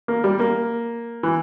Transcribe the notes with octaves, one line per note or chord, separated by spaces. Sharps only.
A#3
G3
A#3
E3